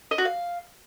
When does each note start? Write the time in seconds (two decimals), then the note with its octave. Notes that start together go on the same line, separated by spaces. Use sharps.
0.11 D#5
0.18 F#4
0.25 F5